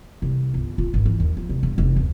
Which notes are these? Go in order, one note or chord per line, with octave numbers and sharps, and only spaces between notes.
C2
G1
F4
G#1
E3
D#2
F3
C2
G2
F1
D2